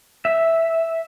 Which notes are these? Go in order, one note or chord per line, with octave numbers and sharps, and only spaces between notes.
E5